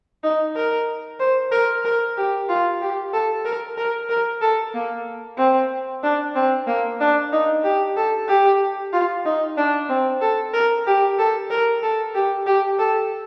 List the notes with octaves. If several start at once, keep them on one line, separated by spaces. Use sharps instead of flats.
D#4
A#4
C5
A#4
A#4
G4
F4
G4
A4
A#4
A#4
A#4
A4
A#3
C4
D4
C4
A#3
D4
D#4
G4
A4
G4
F4
D#4
D4
C4
A4
A#4
G4
A4
A#4
A4
G4
G4
A4